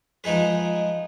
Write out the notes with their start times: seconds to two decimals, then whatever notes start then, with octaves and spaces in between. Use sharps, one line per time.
0.24 F3 G#3 D#4 G#4 B4